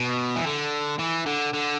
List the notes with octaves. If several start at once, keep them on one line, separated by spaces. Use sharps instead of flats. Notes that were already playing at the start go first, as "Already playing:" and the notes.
Already playing: B2
E3
D3
E3
D3
D3